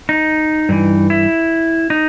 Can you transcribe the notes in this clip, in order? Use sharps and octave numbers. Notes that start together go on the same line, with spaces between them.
D#4
G2 E3
E4
D#4